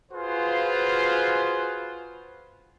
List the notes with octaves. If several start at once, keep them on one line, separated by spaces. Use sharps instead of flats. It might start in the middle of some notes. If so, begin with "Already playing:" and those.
F4 F#4 G#4 B4 C5